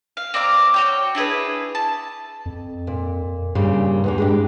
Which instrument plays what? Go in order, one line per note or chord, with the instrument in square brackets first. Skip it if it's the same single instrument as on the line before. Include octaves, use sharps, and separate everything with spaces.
[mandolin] F5
C4 D5 F5 A#5
F#4 C#5 G5
D4 E4 G#4 B4
A5
[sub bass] F2
[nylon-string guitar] A#2
[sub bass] G2 [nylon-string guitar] A#2 C#3 G3
[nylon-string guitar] E2 E3 A#3
G#3 D4 G4